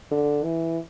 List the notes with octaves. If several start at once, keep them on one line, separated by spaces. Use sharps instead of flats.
D3
E3